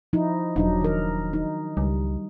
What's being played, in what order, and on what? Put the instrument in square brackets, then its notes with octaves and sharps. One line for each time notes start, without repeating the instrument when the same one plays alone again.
[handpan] F3 D#4 E4
[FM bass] E1 [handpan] F#3 D4 D#4
[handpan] D#3 A#4
D#4
[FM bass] C#2 [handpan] G3